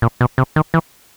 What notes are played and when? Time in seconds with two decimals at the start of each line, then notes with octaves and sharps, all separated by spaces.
0.02 A#2
0.21 B2
0.38 C3
0.56 D#3
0.74 E3